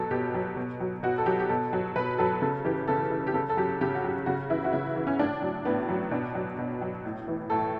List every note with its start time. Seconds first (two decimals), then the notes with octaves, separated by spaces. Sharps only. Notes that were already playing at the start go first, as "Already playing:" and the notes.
Already playing: B2 F#3 A4
0.11 B2 G4
0.34 F#3
0.57 B2
0.80 F#3
1.03 B2 F#4
1.18 A4
1.26 F#3 G4
1.39 G4
1.49 B2 A4
1.73 F#3
1.96 B2 B4
2.18 F#3 A4
2.42 C#3 A4
2.65 E3 G4
2.88 C#3 A4
3.11 E3
3.27 G4
3.34 C#3 A4
3.50 A4
3.57 F#3 G4
3.81 C#3 G4
3.95 F#4
4.04 F#3 G4
4.26 C#3 F#4
4.50 E3 E4
4.64 F#4
4.73 C#3 E4
4.96 E3
5.07 C#4
5.19 A2 D4
5.42 F#3
5.65 A2 B3
5.89 F#3
6.11 B2 D4
6.35 F#3
6.58 B2
6.82 F#3
7.05 A2
7.28 E3
7.50 A2 A4